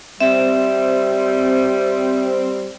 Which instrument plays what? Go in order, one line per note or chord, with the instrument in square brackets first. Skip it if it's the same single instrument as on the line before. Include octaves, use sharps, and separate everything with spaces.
[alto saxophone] G3 [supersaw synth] C4 [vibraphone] E5